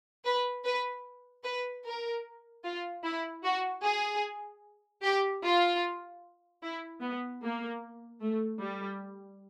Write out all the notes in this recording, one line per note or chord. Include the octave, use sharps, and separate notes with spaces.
B4
B4
B4
A#4
F4
E4
F#4
G#4
G4
F4
E4
B3
A#3
A3
G3